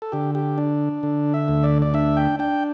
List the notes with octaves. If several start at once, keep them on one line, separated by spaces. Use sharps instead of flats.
A4
D3 G4
G4
D4
D3
E5
D2
D5
D5
D4 E5
G5
D4 G5